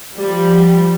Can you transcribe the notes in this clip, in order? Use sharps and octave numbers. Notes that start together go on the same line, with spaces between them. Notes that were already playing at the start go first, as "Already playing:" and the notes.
F3 G3